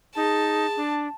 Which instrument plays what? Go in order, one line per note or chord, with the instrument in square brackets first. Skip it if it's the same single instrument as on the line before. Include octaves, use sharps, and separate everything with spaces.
[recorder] D#4 [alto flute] G#4 [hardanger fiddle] A5
[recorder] D4